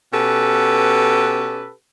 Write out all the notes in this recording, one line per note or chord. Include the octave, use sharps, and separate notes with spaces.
B2 C#4 G4 A4 B4